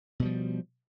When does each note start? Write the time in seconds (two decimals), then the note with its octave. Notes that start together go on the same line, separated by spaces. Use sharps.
0.20 B2
0.22 G3
0.25 F3